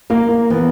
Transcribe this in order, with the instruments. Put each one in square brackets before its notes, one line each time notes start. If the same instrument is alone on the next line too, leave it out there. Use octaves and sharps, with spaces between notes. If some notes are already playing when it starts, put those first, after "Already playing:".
[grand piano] A#3 [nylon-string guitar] A#4
[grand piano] A#3
[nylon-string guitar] E3 [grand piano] B3